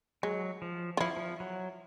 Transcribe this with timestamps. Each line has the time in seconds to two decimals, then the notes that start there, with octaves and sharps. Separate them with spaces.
0.23 F#3 G#3
0.62 F3
0.97 F4
1.01 F3 E4
1.17 F3
1.40 F#3